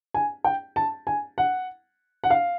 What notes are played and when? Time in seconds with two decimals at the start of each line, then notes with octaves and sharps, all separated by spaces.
0.14 G#5
0.44 G5
0.76 A5
1.07 G#5
1.38 F#5
2.24 F#5
2.30 F5